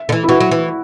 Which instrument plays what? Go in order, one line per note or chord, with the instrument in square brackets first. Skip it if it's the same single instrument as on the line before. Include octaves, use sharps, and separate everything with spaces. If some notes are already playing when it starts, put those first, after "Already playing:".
Already playing: [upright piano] E5
[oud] D3
E3
[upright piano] E4
[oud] E3 [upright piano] F#4
[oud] F#3
E3